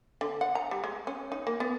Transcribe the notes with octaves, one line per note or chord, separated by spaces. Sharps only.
D3
F#5
A#5
G3
G#3
C#4
D#4
A#3
B3